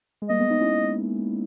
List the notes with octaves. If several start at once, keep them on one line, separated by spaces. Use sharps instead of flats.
G#3
G3 A#3 D#5
G#3 B3
B3 D#4
C#4 E4